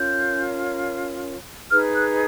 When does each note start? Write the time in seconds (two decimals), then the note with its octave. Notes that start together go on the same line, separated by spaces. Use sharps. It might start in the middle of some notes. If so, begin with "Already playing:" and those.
Already playing: C#4 F4 A#4 C#5 G6
1.71 D#4 G#4 B4 F6
1.95 F#6